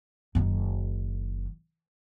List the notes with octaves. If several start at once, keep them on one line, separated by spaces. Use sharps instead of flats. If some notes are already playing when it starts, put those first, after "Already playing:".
F#1 D#3